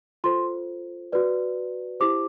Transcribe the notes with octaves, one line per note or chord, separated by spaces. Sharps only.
F4 A4 C5 C6
F#4 B4 D5
E4 G4 C5 D6